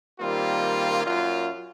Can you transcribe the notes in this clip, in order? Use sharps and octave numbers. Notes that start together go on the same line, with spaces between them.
D#3 G3 A#3 C4 F4
F#2 A#2 F4